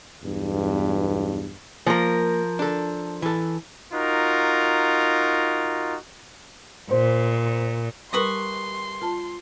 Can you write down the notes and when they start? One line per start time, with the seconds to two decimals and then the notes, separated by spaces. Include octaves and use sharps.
0.23 B1 E2 G2
1.87 F3 A#3 A#4
2.59 D4 A4
3.22 E3 A4
3.93 D#4 F4 F#4 A#4
6.91 A#2 C5
8.13 G3 G4 A#4 B4 C6 C#6 D#6
9.02 F4 C5 A5